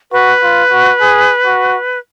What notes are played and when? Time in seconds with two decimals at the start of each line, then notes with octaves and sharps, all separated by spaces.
0.12 F#4 B4
0.42 F4
0.71 F#4
1.01 G#4
1.45 F#4